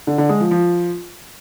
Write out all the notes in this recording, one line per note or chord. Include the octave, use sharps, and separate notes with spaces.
D3
D3
G#3
F3
F3